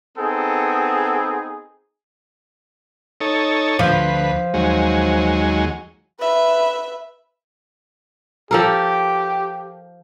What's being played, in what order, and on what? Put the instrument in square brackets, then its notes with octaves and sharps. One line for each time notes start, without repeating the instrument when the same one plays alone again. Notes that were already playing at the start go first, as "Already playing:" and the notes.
[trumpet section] B3 C4 D#4 G#4 A4
[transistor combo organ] D#4 A4 C#5
[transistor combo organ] D2 B4 [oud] F3
[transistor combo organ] D#2 F#3 G#3
[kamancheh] B4 E5
[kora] F3 A4 A#4 [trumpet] G4